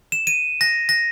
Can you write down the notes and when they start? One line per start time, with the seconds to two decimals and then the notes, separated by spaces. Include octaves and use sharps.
0.12 E7
0.27 D#7
0.61 A#6
0.89 A#6